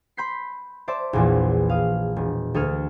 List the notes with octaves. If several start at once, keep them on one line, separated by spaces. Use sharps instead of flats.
B5 C6 G6 B6 C7
C5 D5 E5 A5 D6
A#1 E2 A#2
F5 D#6
E1
D2 A4 D#6 F6 G#6